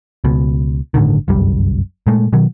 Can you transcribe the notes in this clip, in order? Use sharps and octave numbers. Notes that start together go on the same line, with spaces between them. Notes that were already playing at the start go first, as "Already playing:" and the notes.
C#2 B2
G1 A2 D3 D#3
G1 C2 F#2 G3
A#2 G#3 A3
B2 D#3 F#3